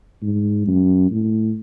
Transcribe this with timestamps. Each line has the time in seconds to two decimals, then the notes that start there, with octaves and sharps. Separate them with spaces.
0.23 G#2
0.67 F#2
1.11 A2